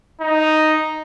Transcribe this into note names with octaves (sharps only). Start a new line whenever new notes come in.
D#4